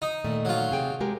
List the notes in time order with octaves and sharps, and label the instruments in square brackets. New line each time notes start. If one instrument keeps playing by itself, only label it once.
[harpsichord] D#4
[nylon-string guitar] A#2 D#3 A3
[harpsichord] F#3 F4
[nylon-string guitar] C3 G#4 G5
G#3 G4 A#4